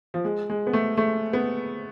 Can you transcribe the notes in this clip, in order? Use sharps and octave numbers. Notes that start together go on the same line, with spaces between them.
F3
G#3
G#3
B3
A3
A3
B3